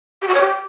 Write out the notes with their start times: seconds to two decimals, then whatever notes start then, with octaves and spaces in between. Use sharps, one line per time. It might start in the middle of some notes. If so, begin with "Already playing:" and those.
0.21 G4
0.28 F#4
0.34 C#5
0.40 G4